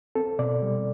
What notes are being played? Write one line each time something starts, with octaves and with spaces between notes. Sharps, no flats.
C4 A4
B2 D5
G3